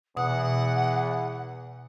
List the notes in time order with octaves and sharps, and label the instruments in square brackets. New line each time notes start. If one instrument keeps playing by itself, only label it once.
[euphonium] E2 [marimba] B2 D#6 [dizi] F#5